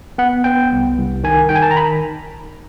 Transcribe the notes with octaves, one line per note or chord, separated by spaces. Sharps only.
B3 F#5
B3 G5
C2
C2
D#3 G#5
D#3 G5
G#5
A5
A#5
B5